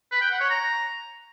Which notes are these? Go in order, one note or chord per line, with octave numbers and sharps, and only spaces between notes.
B4
G5
F#5
C#5
A#5